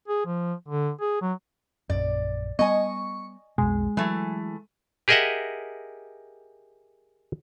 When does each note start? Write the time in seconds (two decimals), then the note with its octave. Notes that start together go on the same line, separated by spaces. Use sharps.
0.08 G#4
0.26 F3
0.68 D3
1.01 G#4
1.22 F#3
1.90 A#1 F#2 D5
2.59 G3 B3 D#5 G#5 C#6
3.58 B1 F2 B2 G#3
3.97 E3 F#3 A3
5.08 G4 G#4 A#4 D#5 E5 F#5